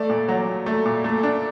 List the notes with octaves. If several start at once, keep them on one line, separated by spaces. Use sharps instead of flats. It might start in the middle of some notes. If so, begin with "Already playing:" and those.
Already playing: A3 D5
A#2
F#3
A#2
A3
A#2
A3
D4